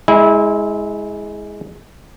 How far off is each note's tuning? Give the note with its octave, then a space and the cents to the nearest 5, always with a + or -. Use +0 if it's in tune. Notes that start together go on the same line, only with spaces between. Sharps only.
G#3 +5 E4 -25 G#5 -25